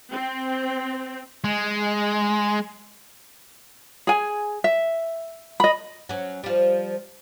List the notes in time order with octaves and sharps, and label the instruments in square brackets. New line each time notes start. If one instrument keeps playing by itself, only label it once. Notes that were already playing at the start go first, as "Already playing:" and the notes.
[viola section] C4
[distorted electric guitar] G#3
[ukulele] G#4 G#5
E5
D#5 B5
[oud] F#3 C#4
F3 G3